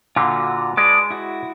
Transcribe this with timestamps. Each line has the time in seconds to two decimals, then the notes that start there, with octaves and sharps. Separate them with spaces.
0.16 A#2 D3 F4 F#4
0.77 G#3 B4 D5 A5
1.10 E4 F#4